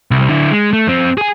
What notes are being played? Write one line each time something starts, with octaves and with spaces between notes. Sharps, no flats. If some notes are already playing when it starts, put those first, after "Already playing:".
C2
D3 E4
G#3
A3
F2 C4
G#4 G#5